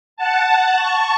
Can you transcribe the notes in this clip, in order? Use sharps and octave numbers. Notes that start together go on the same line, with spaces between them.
F#5 A5
A5 C#6